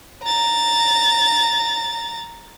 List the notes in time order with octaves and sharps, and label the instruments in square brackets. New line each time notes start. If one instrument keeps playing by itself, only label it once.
[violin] A#5 A6